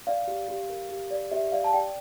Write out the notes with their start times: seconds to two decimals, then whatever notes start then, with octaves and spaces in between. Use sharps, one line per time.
0.07 D5 F5
0.28 G4
0.49 G4
0.70 A#4
0.89 G4
1.11 D5
1.31 G4 E5
1.52 D5 F5
1.64 A5
1.73 D5 G5